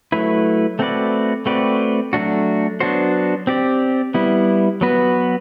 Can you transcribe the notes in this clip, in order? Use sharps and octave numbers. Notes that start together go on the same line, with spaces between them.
F#3 A3 E4 B4
A3 C4 F#4 B4 D5
A3 C4 F#4 B4 D5
F#3 A3 D4 F#4
F#3 B3 D4 F#4 C5
C4 G4 D5
G3 B3 E4
F#3 B3 F#4 B4